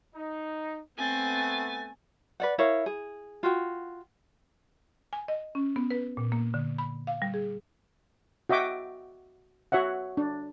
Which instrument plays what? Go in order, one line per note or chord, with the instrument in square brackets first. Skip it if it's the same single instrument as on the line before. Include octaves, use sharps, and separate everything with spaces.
[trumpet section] D#4
[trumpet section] A3 B3 [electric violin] C4 [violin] G#5 A6
[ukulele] B4 D5 F#5
E4 A#4 C#5 F5
G#4
F4 F#4 G5
[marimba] G#5
D#5
C#4
B3
B4
A#2
A#3
D3
B5
F5
G3
G#4
[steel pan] F#4 D#5 E5 G5 D6
F#4 C#5 E5 F#5
D4